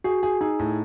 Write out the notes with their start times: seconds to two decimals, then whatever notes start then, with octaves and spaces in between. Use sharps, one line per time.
0.04 F#4 G#4
0.23 G#4
0.41 D#4 G#4
0.59 A2